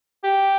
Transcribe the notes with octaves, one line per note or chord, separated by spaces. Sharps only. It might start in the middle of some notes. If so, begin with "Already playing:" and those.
G4